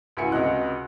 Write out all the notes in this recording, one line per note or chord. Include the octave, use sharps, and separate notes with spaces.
C#2 A2 F#4 E5 G#5 C#7
C#2 C3 F#4 D#5 F#6